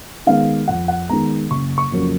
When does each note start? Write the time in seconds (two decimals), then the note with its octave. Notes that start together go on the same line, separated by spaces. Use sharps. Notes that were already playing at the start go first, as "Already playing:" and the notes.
0.27 D#3 G#3 B3 F5
0.68 F2 F#5
0.88 F#5
1.09 D#3 G#3 B3 A#5
1.50 F#1 C#6
1.78 C#6
1.92 F2 C#3 F#3 A#3